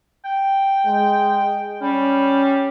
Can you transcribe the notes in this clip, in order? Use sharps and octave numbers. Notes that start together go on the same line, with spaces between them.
G5
G#3
G3 C#4